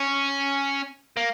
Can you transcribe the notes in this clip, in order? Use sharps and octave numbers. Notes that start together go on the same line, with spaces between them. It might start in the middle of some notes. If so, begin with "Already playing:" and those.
Already playing: C#4
A#3